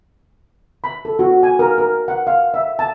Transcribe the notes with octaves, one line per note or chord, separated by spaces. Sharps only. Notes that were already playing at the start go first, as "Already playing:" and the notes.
B5
A4
F#4
G#5
A#4
A#4
F#5
F5
E5
A5